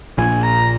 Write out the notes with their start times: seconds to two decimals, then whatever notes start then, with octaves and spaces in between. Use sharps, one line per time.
0.18 A#1 A#2 G#5
0.43 A#5